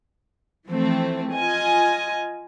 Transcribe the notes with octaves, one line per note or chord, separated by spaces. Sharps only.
E3 F3 A3 C4
F4 D#5 G#5